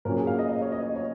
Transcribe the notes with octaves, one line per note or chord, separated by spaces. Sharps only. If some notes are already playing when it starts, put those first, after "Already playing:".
A#2 F#3 C#4 A#4
G#4
F5
D#5
D#5
C#5
D#5
D#5
C#5